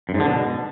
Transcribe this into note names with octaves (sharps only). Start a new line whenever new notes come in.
F#2
G#2
D3
B2